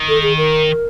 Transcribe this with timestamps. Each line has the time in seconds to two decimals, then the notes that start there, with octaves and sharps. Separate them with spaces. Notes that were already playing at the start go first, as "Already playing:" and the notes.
Already playing: D#3
0.09 A4
0.23 G#4
0.38 A#4